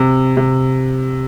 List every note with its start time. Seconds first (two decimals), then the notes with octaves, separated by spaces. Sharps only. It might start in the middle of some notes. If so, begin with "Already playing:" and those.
Already playing: C3
0.37 C3